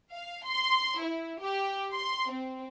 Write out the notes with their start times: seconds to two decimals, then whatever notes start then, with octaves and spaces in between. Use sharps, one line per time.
0.13 F5
0.44 C6
1.00 E4
1.42 G4
1.93 C6
2.30 C4